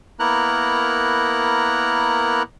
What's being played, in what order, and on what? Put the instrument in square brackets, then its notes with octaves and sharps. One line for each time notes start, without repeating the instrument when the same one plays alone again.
[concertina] A#3 B3 E4 A#4 A#5 F#6